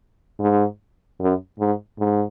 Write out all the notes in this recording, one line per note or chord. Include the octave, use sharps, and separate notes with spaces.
G#2
F#2
G#2
G#2